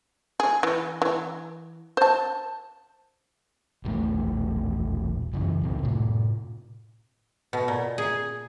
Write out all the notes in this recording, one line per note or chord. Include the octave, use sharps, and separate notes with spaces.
G#4
E3
E3
C5 A5
E1 A#1 A3
F#2 C#3 E3
C#2 A#2 C4
A2 C3
B2
A#2
G#4